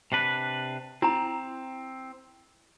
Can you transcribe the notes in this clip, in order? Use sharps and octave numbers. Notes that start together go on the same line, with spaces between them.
C3 D4 B4
C4 E4 A#5